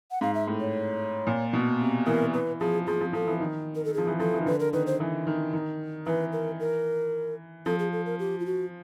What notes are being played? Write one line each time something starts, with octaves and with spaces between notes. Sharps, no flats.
F#5
G#2 F5
E5
A2
C#5
A#2
B2
C3
E3 A#4
E3 B4
F3 G#4
F3 G#4
F3
F3 A4
E3
D#3
A#4
A4
F3 G#4
E3
F3 A4
E3
D#3
D3 B4
A#4
D#3 B4
C5
E3
D#3
D#3
E3 B4
A#4
A#4
F3 A4
G#4
A4
A#4
G4
F4
F#4